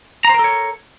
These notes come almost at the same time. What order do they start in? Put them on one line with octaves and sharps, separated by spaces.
A#5 C5 A#4 A4 C#5